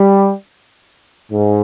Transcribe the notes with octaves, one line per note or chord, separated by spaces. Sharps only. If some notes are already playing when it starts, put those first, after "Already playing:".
Already playing: G3
G#2